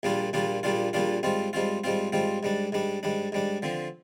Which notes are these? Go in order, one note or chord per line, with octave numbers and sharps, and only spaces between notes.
A#1 A#2 G3 D4 F4
A#1 A#2 G3 D4 F4
A#1 A#2 G3 D4 F4
A#1 A#2 G3 D4 F4
G#2 G3 C4 F4
G#2 G3 C4 F4
G#2 G3 C4 F4
G#2 G3 C4 F4
G#2 G3 D4
G#2 G3 D4
G#2 G3 D4
G#2 G3 D4
D3 F3 C4